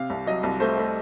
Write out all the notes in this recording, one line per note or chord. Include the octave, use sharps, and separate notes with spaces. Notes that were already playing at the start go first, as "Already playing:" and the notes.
Already playing: C3 F5
C2
F#3 D#5
C2
A3 C5
A3